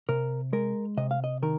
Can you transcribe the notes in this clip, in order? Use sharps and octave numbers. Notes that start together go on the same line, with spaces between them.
C3 A#4
G#3 A#4
C3 D#5
F5
D#5
D#3 A#4